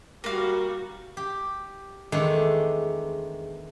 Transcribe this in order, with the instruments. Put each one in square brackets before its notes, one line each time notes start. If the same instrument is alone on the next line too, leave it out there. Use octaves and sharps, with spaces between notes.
[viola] G3 F#4 [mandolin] A#3 F5
[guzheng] G4
E2 D#3 G#3 A3 D4